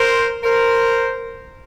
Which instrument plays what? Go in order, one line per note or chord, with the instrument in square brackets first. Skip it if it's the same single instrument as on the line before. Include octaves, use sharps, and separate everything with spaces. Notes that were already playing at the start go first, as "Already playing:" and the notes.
Already playing: [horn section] A#4 C5
A#4 C5